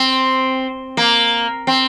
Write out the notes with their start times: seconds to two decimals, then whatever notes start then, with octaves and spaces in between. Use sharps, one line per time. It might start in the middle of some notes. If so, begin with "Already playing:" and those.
Already playing: C4
0.97 A#3
1.67 C4